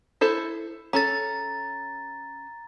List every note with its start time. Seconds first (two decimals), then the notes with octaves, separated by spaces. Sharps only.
0.21 E4 A4 C5
0.93 C#4 A4 A#5 A6